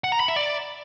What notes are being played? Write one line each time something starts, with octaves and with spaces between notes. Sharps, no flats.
F#5
A#5
B5
E5
D5